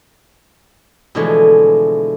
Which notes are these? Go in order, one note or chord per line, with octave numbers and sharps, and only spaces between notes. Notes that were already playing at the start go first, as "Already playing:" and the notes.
B2 D3 E3 F3 G#3 A3